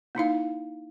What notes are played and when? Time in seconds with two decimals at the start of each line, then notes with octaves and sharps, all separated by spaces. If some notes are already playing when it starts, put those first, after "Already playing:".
0.15 A#3 D#4 E4 F5